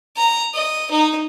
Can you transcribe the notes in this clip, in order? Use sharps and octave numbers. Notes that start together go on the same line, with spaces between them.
A#5
D#5
D#4